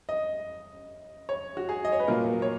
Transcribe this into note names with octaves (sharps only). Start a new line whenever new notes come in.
D#5
C#5
F#4
G#4
D#5
C#5
B4
A#2 F#3 A#3 A#4
C#5